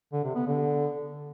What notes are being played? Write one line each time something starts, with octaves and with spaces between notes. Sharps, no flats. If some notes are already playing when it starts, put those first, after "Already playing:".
D3
C3
B3
D3